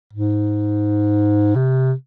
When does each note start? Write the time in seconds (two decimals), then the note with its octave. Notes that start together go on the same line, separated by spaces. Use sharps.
0.13 G#2
1.55 C3